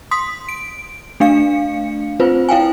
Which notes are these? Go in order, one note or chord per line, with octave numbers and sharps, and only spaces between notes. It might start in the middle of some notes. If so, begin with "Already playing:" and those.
C6 D#6 B6
D7
A3 D4 F5 C#7
C4 F4 B4 C5
E4 F5 G5 G#5